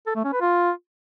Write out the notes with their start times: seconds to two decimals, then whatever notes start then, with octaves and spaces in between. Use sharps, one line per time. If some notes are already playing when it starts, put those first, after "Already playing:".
0.07 A4
0.15 A3
0.24 C#4
0.33 B4
0.41 F4